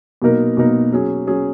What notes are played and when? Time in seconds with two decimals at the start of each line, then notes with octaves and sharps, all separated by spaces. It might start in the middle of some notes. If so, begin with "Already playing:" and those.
0.22 B2 F#3 A#3 D#4 A#4
0.57 B2 F#3 A#3 D#4 A#4
0.92 F#3 C#4 G#4
1.27 F#3 C#4 G#4